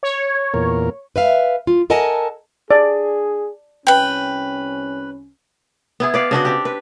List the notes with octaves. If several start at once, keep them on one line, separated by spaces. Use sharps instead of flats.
C#5
E2 A#2 A#4
B4 E5 F5
F4
A4 A#4 D#5 F#5 G#5 A5
D4 G#4 D5
C2 C#4 B4 G5
B3 E4 G#4
B4 D5 F5
C#3 D4 F#4 D#5
C4 D4 G4
B4